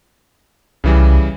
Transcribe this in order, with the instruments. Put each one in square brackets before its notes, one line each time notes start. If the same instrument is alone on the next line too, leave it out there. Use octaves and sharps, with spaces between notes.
[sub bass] C2 [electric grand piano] C#3 E3 G3